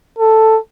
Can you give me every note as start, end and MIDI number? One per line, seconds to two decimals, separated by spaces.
0.19 0.58 69